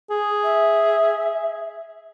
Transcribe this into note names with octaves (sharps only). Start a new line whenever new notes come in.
G#4
E5